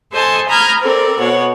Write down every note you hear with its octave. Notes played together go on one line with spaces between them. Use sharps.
A4 C5 D#5 G#5 A5 D#6
A#5 B5 D#6 F6 G6 G#6
C4 A4 A#4 D5
B2 C#5 F#5